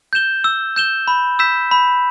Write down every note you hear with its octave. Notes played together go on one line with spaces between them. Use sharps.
G6 E7 G7
E6
G6 E7 G7
B5
E6 G6 B6 E7
B5